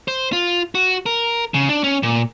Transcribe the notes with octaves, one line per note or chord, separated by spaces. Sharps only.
C5
F4
F#4
A#4
C#3
D4
C#4
A#2